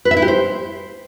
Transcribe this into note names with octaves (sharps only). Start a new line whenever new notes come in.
B4
E5
E4
G4
C5